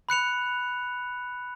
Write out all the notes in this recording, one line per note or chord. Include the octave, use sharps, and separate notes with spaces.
B5 F#6 C#7 F7